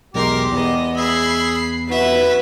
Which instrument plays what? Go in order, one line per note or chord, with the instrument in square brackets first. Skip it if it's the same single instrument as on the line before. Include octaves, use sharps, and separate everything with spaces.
[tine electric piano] B1 E2 G#3 [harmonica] G4 [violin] A#4 C6
[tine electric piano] E2 [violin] B3 D#5
[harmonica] G#3 E5 [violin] B5 C7
[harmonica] F#4 [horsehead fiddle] B4 [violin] E5